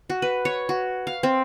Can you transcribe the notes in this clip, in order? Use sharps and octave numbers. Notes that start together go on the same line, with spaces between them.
F#4
B4
C#5
F#4
F5
C4